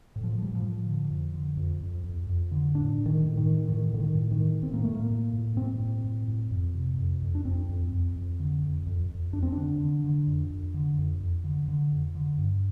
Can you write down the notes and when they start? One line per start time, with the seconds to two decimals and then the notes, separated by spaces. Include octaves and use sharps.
0.16 A2
0.23 F3
0.39 A2 G3
0.55 F3
0.63 A2
0.86 D3
1.10 F2
1.34 D3
1.57 F2
1.81 F2
2.03 F2
2.27 F2
2.51 D3
2.74 A2 D4
2.98 A2
3.06 D#3
3.22 A2
3.37 D#3
3.45 A2
3.68 A2 D#3
3.92 A2 D3
4.00 D#3
4.15 A2
4.31 D#3
4.38 A2
4.62 A2 C4
4.73 A#3
4.84 A2 A3
4.95 A#3
5.10 A2
5.33 A2
5.56 A2 C4
5.80 A2
6.04 A2
6.28 A2
6.51 F2
6.74 C3
6.98 F2
7.22 F2
7.35 D4
7.45 F2 C4
7.69 F2
7.92 F2
8.16 F2
8.39 D3
8.63 F2
8.86 F2
9.09 F2
9.33 F2 D4
9.43 C4
9.52 D3 D4
9.79 D3
10.04 D3
10.27 F2
10.50 F2
10.74 D3
10.98 F2
11.21 F2
11.44 D3
11.68 D3
11.92 F2
12.15 D3
12.38 G2